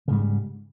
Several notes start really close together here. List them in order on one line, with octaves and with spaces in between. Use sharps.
C#3 G#2 G3